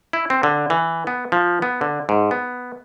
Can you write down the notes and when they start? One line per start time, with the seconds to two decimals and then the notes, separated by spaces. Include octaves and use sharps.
0.13 E4
0.30 C4
0.43 D3
0.70 E3
1.07 B3
1.32 F3
1.62 B3
1.81 D3
2.09 G#2
2.31 B3